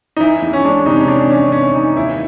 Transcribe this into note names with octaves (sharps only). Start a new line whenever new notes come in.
D#4
E3 E4
E2
C#4
G#3 D4
C3 D#4
C#4
E3 D4
D4
E3 C#4
E3 C#4
E3 D#4
D#2 E4